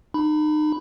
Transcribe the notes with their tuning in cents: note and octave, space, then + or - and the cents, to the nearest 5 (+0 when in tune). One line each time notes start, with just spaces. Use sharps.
D#4 -35 B5 +0